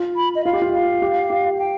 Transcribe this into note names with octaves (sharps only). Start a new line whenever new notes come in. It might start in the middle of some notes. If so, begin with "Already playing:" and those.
Already playing: F4
B5
D#5
F4 F5
G4
F4
F5
G4
G4
G5